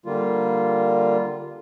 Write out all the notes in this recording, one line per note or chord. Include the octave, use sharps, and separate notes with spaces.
D3 G3 A#3 F4